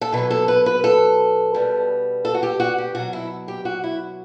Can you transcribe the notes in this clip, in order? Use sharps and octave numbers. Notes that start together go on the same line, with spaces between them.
A4
B2 F#3 B4
A4
B4
B4
A4
B2 G3
A4
F#4
G4
F#4
G4
B2 F#3 F#4
E4
G4
F#4
E4